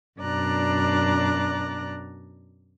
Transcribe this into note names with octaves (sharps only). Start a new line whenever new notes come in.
F#2 B2 D4 D5 A#5 F#6